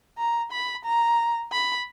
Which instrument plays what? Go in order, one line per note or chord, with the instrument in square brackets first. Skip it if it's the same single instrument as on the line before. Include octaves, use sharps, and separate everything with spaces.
[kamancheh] A#5
B5
A#5
B5